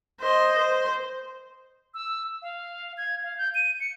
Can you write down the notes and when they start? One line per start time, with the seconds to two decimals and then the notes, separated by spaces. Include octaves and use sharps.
0.20 C5 D#5
0.59 C5
1.94 E6
2.42 F5
2.98 G#6
3.24 F5
3.38 G6
3.55 D#7
3.80 C#7